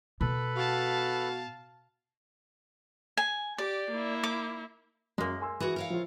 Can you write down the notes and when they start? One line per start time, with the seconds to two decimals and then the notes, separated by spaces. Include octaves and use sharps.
0.21 B2 A4 B4 B5
0.56 F#4 F5 A5
3.17 G#5
3.58 G4 D5
3.91 A#3 E4
4.23 D6
5.18 F#2 F#3 G#3 A#3
5.41 G#5 C6 E6
5.60 E3 F#4 G#4
5.76 A#4 C#5 F5
5.90 F3 F4